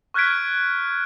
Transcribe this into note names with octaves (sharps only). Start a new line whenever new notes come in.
C#6 F6 F#6 G#6 B6 D7